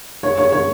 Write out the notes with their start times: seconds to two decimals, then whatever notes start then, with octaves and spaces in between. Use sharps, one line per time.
0.23 C#5
0.38 C#5
0.52 C#5